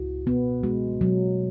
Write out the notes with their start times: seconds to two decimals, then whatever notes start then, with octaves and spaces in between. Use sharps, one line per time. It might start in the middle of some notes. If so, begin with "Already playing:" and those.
Already playing: C#2 E4 F#4
0.26 B2 B3
0.63 G#3 F#4
1.01 B2 F#3